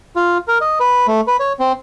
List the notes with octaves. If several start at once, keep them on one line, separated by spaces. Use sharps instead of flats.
F4
A#4
D#5
B4
A3
B4
C#5
C4